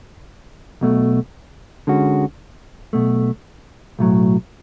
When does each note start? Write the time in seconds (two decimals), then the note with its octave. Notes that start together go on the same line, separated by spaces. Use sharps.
0.81 B1 B2 A3
1.87 D3 G#3 C#4 F#4
2.93 B1 B2 A3
3.99 B1 A2 F#3